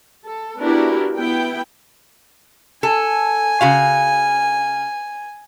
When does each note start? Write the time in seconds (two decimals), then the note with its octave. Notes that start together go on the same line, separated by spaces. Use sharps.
0.24 A4
0.60 B3 D4 E4 F#4 G4 A#4
1.18 B3 E4 G5
2.83 A4 G#5
3.61 C#3 F#4 F5